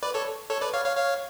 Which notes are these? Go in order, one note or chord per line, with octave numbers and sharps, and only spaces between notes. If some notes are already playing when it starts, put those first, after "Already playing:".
B4 D5
A4 C#5
A4 C#5
B4 D5
C#5 F5
C#5 F5
C#5 F5